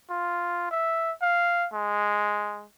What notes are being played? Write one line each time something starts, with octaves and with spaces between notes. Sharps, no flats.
F4
E5
F5
G#3